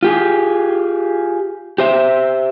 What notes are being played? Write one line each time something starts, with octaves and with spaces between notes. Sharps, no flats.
F4 G4 G#4
G4 C5 E5